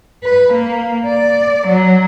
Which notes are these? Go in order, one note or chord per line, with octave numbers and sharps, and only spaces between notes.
B4
A#3
D5
F#3